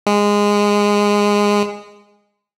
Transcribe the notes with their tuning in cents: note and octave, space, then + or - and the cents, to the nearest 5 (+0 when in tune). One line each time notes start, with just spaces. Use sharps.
G#3 -15